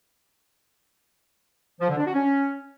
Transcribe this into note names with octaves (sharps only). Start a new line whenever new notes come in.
F3
D3
D4
F#4
C#4